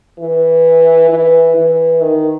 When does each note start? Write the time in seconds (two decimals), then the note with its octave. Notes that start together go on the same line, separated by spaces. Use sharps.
0.19 E3
1.10 E3
1.56 E3
2.02 D#3